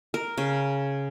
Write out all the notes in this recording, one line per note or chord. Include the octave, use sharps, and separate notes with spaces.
A#4
C#3